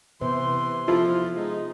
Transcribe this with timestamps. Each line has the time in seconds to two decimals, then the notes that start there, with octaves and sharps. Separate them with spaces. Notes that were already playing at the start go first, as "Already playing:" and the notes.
0.21 C3 E3 B3 C5 C6
0.88 F3 E4 F4 A4
1.36 G#3 D#4